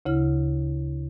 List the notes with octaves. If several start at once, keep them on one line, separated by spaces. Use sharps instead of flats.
D2 C#3 E4 F6